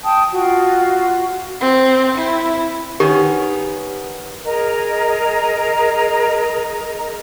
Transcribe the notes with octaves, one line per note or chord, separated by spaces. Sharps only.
G5 A5 D#6
F4 F#4
C4
E4
D#3 B3 C#4 G4
G#4 A#4 D#5 A#5